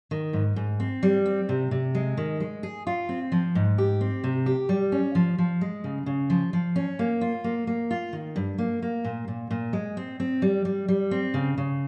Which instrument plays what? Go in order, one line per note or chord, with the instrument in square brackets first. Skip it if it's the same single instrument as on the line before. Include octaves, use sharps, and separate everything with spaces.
[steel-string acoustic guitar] D#3
G#2
G#2
C4
G3
C4
C3
C3
G#3
D#3
G#3
G#4
F4
C4
F3
G#2
G4
C4
C3
G4
G3
C#4
F3
F3
G#3
C#3
C#3
F3
F3
C#4
A#3
F4
A#3
A#3
F4
D#3
G2
A#3
A#3
A#2
A#2
A#2
G#3
C4
C4
G3
G3
G3
C4
C#3
C#3